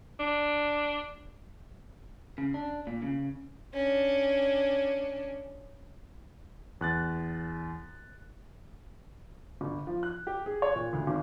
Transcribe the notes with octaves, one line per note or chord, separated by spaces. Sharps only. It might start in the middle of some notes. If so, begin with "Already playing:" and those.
D4
C#3
D4
A#2
C#3
C#4 D4
E2 F#6 A6
G1
F3
F#6
G4
G#4
C#5
A#2
D2
G#1